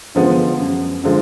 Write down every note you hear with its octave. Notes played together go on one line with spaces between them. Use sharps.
D3 F3 G#3 B3
F#2
D3 F3 G#3